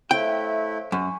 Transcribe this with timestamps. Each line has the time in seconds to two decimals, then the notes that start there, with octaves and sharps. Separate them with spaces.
0.11 A3 E4 C5 C#5 F5 G5
0.92 F#2 G#5 C#6